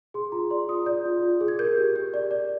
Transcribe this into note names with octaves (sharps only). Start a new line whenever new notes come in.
G#4 C6
F4 A#5
D5 C6
F4 D#6
D5 G6
F4
F4
G#4
G#6
A#4 G6
G4
G4
D5
D5